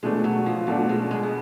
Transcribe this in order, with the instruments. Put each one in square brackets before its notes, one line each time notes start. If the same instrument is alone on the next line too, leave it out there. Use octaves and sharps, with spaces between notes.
[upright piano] B2 A3 D4 [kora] G#3
[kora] F#3
F3
[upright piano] B2 A3 D4 [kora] F#3
[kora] G#3
G#3
B3